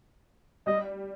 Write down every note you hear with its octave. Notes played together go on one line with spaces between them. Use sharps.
G3 D#5